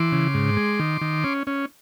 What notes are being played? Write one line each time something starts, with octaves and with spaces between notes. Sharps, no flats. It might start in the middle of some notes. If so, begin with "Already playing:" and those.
Already playing: E3 C6 D6
C#3
G#2
G#3
D#3
D#3
C#4
C#4